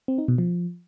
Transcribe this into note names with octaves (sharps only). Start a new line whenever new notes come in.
C4
D#4
B2
F3